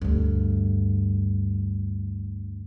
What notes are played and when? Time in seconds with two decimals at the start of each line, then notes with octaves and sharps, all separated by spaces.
0.02 D2 G2